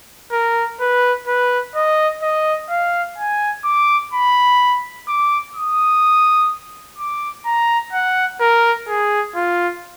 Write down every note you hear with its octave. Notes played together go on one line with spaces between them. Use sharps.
A#4
B4
B4
D#5
D#5
F5
G#5
D6
B5
D6
D#6
D6
A#5
F#5
A#4
G#4
F4